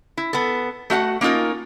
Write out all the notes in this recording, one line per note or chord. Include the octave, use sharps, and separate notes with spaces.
E4
B3 A4
A3 F#4 F5 F#5
A#3 C#4 D#4 F4 A#4